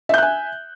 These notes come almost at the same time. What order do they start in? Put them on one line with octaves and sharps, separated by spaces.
E5 G6 F#6 G#5